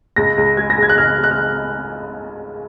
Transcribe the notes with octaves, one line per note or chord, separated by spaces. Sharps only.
C#2 A#6
C#2
G#3 G#6
A#6
C#3 G#6
F#6
C#2 F6
G#3
F#6
F6